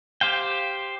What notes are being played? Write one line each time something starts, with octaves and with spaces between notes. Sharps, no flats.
G4 C5 F5 G5